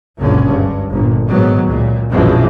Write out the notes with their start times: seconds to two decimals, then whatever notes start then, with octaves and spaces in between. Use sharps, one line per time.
0.19 F#1 C#2 A#2 D3 C#4
0.49 G2
0.91 G1 A#2
1.27 G#2 D#3 F#3 B3
1.67 C#2 A#2
2.10 A#1 F#2 B2 E3 F3 G#3